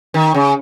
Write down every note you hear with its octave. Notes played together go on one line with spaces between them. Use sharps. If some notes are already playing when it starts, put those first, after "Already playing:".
D#3
C#3